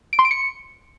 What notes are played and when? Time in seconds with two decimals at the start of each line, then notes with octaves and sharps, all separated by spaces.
0.13 D7
0.19 C6
0.25 D7
0.31 C#7